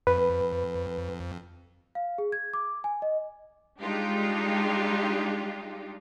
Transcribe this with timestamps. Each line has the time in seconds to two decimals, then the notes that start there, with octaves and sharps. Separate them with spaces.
0.07 F2 B4
1.95 F5
2.18 G#4
2.32 G#6
2.54 D6
2.84 G#5
3.02 D#5
3.81 G3 G#3 D4 D#4 F4 G4